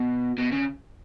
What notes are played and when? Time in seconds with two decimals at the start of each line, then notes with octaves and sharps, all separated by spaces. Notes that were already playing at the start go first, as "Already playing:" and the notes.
Already playing: B2
0.38 B2
0.52 C#3